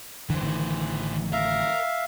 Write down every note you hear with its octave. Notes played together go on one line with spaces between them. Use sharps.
F2 D3 E3 C5
A1 D3 D#3
A#4 E5 F5